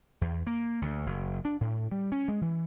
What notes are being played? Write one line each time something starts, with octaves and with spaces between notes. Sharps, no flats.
E2
A#3
D2
F#1
D4
A2
G3
C#4
G#3
E3